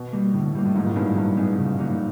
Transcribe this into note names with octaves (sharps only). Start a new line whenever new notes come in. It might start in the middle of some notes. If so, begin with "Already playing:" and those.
Already playing: B2
G3 A#3
A2 D3
G3 A#3
A2
G#2 F#3
A#2
A2
G2 B3 D#4 G#4
G#2
G2 F#3
B3 D#4 G#4
C#3
F#3 A#3 D#4